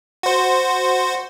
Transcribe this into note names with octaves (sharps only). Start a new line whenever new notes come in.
F#4 C5